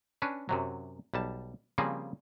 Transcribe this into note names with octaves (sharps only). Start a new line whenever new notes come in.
C#4 D4 B4
F#2 C3 F#3
B1 G3 A5
C#3 F3 G3 A#3 C4 G#4